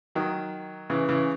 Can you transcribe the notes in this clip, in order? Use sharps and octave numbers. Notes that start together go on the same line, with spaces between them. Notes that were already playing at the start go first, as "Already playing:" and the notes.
D#3 F#3
C#3 E3
C#3 E3